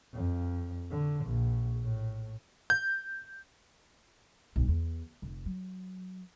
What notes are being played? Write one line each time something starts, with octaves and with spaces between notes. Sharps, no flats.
F2
D3
A#1
A2
G6
B1 G2
E2
F1
F#3